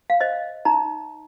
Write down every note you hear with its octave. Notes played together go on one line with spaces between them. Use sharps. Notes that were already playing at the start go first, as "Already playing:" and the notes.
F5
C5 D#5
D#4 A#5